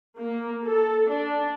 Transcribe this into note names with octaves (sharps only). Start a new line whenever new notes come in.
A#3
A4
D4